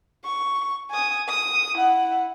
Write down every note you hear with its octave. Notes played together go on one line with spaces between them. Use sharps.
C#6
G#5 D#6
D#6
E4 F#5